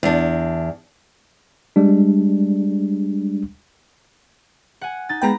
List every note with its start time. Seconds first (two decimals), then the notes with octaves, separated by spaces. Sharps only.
0.03 E2 D4
1.76 G3 G#3 D4
4.81 F#5 G#5
5.09 D#4 A6
5.22 G#3 B3 G5 A#5 B5